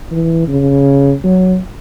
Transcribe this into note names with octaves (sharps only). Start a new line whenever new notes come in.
E3
C#3
F#3